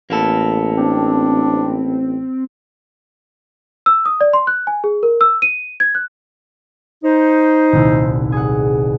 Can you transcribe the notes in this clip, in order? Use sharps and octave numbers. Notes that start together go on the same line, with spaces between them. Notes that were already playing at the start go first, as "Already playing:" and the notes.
A1 A#3 B3 A4
C4 D4
E6
D#6
D5
C6
F#6
G#5
G#4
A#4
E6
D#7
G#6
F#6
D#4 C5
D#1 C2 E4
G#4 F#5